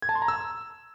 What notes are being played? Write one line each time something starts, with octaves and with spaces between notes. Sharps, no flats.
G#6
A5
C6
A#5
E6